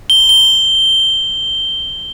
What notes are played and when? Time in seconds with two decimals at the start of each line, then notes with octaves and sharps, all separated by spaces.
0.10 G7
0.29 G7